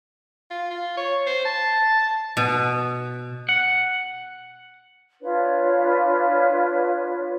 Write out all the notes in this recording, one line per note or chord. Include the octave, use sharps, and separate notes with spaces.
F4
F4
C#5
C5
A5
B2
F#5
D4 F4 B4 C#5